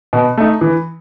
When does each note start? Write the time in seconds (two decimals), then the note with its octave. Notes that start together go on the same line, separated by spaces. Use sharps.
0.13 B2
0.37 A3 D#4
0.61 E3